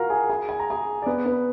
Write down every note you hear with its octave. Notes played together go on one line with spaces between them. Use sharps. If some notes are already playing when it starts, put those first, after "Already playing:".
Already playing: F4 F#4 A#4 F5 F#5 A#5
G#4 G#5
G#4 G#5
G#5
A#5
G#4 G#5
D5
B3 B4
B3 B4